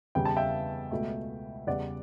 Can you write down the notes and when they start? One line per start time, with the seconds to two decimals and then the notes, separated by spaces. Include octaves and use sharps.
0.15 E2 C#3 G3 G5
0.25 A5
0.36 E5 G5
0.91 C#2 B2 A3
1.67 E2 C#3 G3 D5 F#5